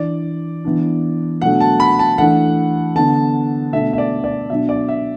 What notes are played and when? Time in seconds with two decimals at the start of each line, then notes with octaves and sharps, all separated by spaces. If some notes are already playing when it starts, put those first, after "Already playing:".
Already playing: E3 D4 D5
0.65 E3 B3 D4
1.42 B2 F#3 A3 D4 F#5
1.61 A5
1.80 B5
1.99 A5
2.18 E3 A3 D4 F#5
2.95 D3 B3 D4 A5
3.73 B2 A3 D4 E5
3.93 E5
3.98 D5
4.24 D5
4.50 B2 F#3 D4 E5
4.69 D5
4.89 E5